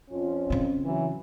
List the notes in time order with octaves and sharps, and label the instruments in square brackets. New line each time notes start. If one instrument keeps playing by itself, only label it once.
[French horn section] F2 C#4 F4
[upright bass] C#3 C4
[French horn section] E3 F#3